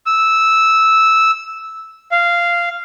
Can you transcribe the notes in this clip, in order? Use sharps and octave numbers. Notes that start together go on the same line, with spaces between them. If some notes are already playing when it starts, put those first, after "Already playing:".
E6
F5